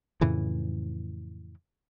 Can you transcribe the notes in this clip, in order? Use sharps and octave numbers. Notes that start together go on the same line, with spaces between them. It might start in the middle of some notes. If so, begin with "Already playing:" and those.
F2 A2 C#3 E3